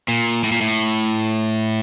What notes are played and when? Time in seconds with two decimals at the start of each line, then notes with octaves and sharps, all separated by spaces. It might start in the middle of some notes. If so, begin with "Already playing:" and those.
0.08 A#2
0.44 A2
0.52 A#2
0.61 A2